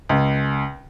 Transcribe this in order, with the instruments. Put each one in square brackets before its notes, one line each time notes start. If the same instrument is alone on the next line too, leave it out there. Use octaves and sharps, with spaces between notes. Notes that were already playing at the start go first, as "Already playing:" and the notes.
[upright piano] C#2